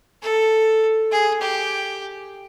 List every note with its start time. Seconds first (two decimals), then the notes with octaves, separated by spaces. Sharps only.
0.23 A4
1.12 G#4
1.41 G4